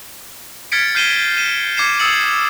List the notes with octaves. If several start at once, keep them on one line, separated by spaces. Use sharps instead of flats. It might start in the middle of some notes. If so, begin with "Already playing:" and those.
F6 G#6 A6 B6 C#7 D7
F6 G6 C7 D#7 E7 G7
D#7 E7
D6 G#6 C7 C#7 E7
D#6 E6 A6 C#7 F#7